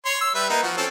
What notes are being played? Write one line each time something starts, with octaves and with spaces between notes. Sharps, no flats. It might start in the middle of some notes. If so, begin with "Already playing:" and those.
C#5 C6
E6
G3 B4 E5
A#3 B3 D#4
F3 F#4
C4 C#4 A4